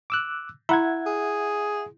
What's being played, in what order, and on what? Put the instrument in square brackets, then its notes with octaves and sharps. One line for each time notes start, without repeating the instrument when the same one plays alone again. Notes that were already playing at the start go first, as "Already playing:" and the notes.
[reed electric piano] D6 E6 F#6
[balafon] E4 A#5 B5 [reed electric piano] E5 F#5 G#6
[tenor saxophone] G#4